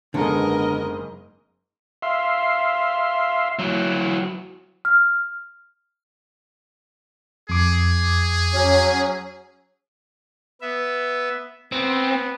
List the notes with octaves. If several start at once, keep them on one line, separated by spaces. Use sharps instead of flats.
F#1 G#2 D3 B3 G#4 A#4 D#5
E5 F5 C6
F#3 E4
F6
F2 G#4 D6
F#3 C#4
B3 E5
B3 C4